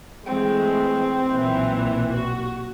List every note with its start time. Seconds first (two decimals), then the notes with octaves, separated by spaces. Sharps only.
0.26 E3 G#3 A3 C4
1.32 B1 A#2 E3
2.13 F#4